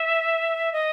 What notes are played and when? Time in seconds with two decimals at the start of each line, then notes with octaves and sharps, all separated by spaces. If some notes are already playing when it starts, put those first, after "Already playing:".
Already playing: E5
0.72 D#5